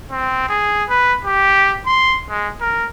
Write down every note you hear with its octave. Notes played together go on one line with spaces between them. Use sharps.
C4
G#4
B4
G4
C6
G#3
A#4